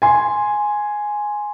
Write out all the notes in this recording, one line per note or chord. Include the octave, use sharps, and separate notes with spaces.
G#5 C6